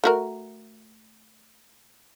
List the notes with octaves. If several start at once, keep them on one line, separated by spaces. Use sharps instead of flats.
A3 F#4 A#4